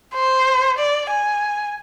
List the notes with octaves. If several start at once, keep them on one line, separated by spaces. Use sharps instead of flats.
C5
D5
G#5